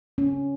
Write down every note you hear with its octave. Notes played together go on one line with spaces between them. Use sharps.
C#4